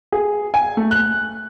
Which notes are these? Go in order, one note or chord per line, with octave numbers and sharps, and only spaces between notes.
G#4
G#5
A3
F#6